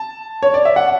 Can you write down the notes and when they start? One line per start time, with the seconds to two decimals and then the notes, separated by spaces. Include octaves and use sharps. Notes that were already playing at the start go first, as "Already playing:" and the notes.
Already playing: A5
0.43 C#5
0.54 D5
0.65 E5
0.76 F#5